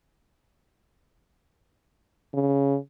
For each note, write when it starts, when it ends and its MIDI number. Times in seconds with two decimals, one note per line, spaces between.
2.34 2.77 49